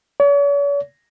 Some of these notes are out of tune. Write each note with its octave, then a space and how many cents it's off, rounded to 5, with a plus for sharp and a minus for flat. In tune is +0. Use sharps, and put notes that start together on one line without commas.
C#5 +45